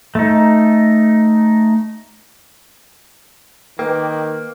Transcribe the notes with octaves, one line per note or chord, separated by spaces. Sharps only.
A3 D#4
D#3 A#3 A#4 B4 G5 D6